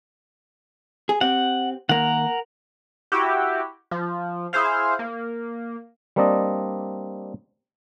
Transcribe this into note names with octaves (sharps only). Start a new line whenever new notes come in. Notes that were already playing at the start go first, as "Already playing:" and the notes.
G#4
C4 G4 F#5
D#3 A#3 A#4 F#5
E4 F#4 G4
F3
E4 G#4 C5 F5
A#3
G3 A#3 C4 D4 D5 D#5